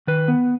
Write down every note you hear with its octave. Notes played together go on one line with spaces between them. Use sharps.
D#3 B4
B3